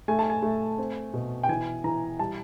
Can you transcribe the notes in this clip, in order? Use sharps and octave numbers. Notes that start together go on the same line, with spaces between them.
A3 G#5
A5
G#5
A3
C4
B2
G5
E3 G#5
E3 A#5
G3 A5